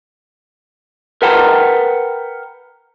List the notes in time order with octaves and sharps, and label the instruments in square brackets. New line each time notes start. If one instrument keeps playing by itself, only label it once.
[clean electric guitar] A#4 B4 F#5 G5 A5 A#5